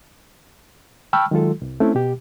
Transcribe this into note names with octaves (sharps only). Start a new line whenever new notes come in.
G5 A5 B5 C#6 E6 F6
D#3 F#3 G#3 F4 A4
C2
A3 C4 C#4 E4
B2 G4